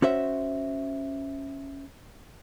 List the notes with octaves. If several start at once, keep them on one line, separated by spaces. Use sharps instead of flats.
C#4 F#4 C5 E5